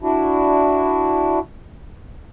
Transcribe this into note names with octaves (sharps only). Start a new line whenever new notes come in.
D4 E4 F#4